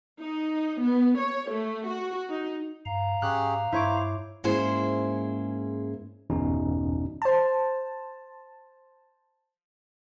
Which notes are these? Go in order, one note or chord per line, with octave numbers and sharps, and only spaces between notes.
D#4
B3
C#5
A3
F#4
D#4
G2 F5 A#5
G#2 C#4 G4 G#4 F#6
G2 E4 C5 C#5 D6
G#2 A#3 C#4 E4 G#4 C5
G1 E2 B2 C#4 D#4
C5 A5